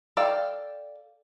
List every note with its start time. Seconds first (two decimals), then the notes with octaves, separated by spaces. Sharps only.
0.17 A4 D5 F5 G5